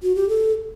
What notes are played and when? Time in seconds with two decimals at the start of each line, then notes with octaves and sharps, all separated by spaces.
0.03 F#4
0.15 G4
0.29 A4